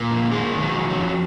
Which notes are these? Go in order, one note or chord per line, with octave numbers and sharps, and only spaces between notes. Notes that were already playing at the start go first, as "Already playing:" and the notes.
Already playing: A#2 A#3
F2
G#2 D#3 G#3
D#3
F#3
F2
F#3
F2